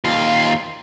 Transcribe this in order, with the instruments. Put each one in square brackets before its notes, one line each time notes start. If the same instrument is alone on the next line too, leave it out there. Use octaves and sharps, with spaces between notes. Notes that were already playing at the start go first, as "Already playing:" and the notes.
[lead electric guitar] D#2 F4